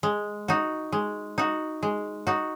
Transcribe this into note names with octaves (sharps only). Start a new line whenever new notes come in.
G#3
D#4 F#4
G#3
D#4 F#4
G#3
D#4 F#4